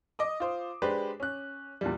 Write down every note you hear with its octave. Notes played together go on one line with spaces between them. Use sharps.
D#5 D6 D#6
F4 C5
G#3 D4 G4 B4 C5
C#4 F#6
E2 A#2 G3